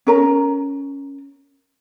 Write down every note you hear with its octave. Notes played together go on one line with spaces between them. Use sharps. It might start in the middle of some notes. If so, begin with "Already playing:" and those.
C#4 A#4 A#5